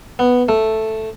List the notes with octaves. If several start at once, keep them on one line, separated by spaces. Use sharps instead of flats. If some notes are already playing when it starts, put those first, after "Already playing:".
B3
A3